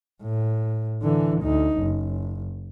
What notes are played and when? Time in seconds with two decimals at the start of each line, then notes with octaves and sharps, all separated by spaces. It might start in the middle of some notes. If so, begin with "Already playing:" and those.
0.22 A2
1.03 D3 E3
1.42 D2 D#4
1.78 F#1